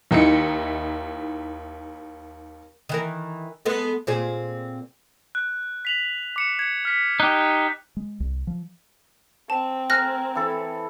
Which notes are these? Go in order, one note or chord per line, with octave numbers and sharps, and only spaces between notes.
D#2 D#4 E4 C#7
D#3 E3 A#4
G#3 B3 A4
A#2 C4 G#4
F#6
B6 F7 F#7
D6 C#7 E7
G#6 C#7
F6 B6
D#4 G4 F#6
G#3
C2
F3
C4 A5
A#4 G#5 F6 F#6 A#6
E3 E4 A4